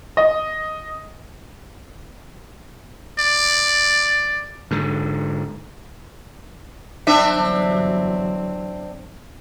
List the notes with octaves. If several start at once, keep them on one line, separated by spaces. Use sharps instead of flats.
D#5
D5
G#2 D3
G1 E3 F#3 C4 D4 E5